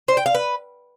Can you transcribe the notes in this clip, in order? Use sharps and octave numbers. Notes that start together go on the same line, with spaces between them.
C5
G5
F5
B4